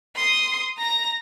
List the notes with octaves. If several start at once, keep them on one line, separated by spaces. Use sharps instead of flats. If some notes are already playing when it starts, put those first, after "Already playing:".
C6 D#6
A#5 A#6